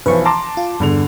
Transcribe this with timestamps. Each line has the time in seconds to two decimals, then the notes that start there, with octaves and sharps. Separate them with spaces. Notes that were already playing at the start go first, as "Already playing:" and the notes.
0.06 B1 E3 F3 B4 C#6
0.25 A5 A#5 C6 D6
0.57 F4
0.80 E2 G2 D3 F7